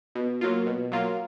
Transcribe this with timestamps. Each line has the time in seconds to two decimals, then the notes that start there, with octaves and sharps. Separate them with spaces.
0.15 B2
0.41 F#3 A#3 F4
0.66 B2
0.92 F#3 A#3 F4